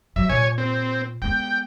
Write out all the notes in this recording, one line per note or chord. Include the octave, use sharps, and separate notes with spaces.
F#3 E5
A#2 C#5 G#5
C4
G#3 B3 G5